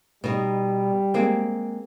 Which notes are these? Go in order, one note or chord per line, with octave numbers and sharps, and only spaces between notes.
B2 G3 D#4
G#3 A#3 C4